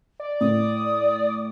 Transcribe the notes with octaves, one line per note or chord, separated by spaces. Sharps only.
D5
A2 D#6